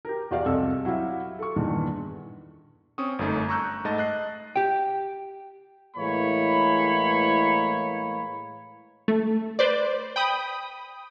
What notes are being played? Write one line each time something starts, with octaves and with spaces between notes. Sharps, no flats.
G4 A#4
E2 F#4 G4 D5 F5
C2 F2 A4 D#5 E6
F#3 E4 F#4 G4 E5 F5
A4 C#6
E2 G2 A#2 D#3 E3
C4 C#4 C#6 D#6
G1 F#2 A3 D#4
A#5 C#6 E6 F#6 G6
G#2 A3 D#5 A5 A6
D#5 F#6 C7
G4 G5
A2 E3 G#3 A#3 C#5 B5
A3
B4 C5 D5
G5 B5 D#6